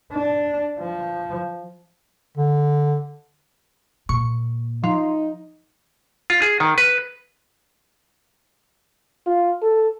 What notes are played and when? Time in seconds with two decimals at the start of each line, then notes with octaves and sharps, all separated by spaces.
0.12 D4
0.79 F3
2.37 D3
4.09 A#2 C#6
4.84 F3 D#4
6.30 F4
6.42 G#4
6.60 D#3
6.78 B4
9.27 F4
9.62 A4